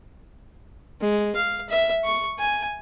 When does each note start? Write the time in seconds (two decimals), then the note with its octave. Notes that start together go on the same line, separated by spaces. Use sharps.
1.01 G#3
1.35 F5
1.69 E5
2.04 C#6
2.39 G#5